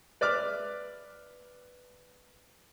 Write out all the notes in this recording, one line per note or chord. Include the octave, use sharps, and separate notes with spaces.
B4 D5 E5 D6 F6